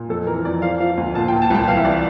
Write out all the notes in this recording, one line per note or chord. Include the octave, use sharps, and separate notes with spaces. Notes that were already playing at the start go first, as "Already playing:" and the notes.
Already playing: A#2
F2 A4
E3 A#4
F2 D5
F3 F5
F3 F5
D2
A#2 A5
G5
A#2
A5
C2 G5
E3 F5
E5
D5